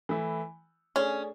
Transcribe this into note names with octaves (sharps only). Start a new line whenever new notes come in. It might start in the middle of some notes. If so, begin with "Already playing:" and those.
E3 A3 E4
A3 C#4 D4 G#4